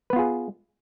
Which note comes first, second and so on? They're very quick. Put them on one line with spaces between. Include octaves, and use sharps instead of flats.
B4 B3 F4 G#4